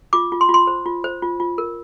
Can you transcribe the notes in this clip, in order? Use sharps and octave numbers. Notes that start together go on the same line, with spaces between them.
F4 D6
F4
C6
F4
C6
C5
F4
C5
F4
F4
A#4